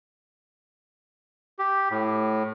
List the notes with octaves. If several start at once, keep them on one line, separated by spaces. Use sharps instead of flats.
G4
A2